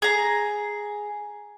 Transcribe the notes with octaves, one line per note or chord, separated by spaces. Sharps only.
G#4 A#5